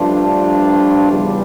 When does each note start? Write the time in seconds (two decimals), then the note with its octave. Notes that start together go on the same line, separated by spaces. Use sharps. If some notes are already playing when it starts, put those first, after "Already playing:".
Already playing: G2 F3 A3 D4 F4
1.10 E2 C#3 G3